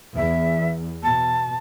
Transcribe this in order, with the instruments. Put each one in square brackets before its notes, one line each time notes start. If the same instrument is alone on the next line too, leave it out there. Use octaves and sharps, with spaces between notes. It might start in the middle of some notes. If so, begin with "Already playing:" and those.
[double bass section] E2 [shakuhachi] E5
[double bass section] B2 [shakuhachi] A5